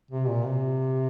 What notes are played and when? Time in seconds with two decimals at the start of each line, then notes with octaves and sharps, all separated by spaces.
0.11 C3
0.28 A#2
0.45 C3